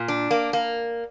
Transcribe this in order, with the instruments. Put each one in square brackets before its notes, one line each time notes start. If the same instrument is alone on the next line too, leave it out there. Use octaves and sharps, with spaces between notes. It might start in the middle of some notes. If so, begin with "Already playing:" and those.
Already playing: [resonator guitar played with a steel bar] A#2
D4
A#3
A#3